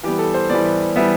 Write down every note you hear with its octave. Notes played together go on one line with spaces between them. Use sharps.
E3 G3 B3 G4
A4
C5
E3 G3 B3 D5
E3 G3 B3 E5